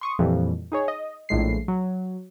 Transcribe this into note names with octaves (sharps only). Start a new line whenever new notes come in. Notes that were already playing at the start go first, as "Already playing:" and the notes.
C6 C#6 D#6
F2 A#2 E3 G3
D#4 G#4 C#5
D#5
A#1 A2 G#3 C7
F#3